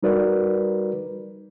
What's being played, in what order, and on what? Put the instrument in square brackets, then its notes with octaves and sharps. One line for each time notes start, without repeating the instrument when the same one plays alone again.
[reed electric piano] G3 D#4 F#4 A#4 B4 D5